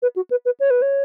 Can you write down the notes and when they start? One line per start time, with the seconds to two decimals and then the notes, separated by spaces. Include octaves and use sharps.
0.02 B4
0.16 F#4
0.31 B4
0.45 B4
0.60 C#5
0.70 B4
0.82 C#5